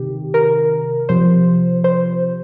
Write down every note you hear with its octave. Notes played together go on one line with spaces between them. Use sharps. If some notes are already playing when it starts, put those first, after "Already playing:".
Already playing: C3 D#3 G4
A#4
C3 F3 C5
C5